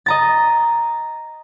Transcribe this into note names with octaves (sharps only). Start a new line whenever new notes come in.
D#5 A#5 A6